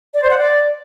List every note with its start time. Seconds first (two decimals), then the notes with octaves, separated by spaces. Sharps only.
0.14 D5
0.22 C5
0.30 F#5
0.38 D5